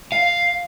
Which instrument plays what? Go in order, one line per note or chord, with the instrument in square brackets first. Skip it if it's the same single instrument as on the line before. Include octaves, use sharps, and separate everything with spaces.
[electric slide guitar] F5